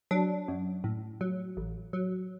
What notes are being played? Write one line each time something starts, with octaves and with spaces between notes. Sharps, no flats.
F#3 D4
F#2
A2
F#3
A1
F#3